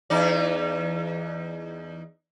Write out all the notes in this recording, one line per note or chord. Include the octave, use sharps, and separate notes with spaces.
E2 D#4 D5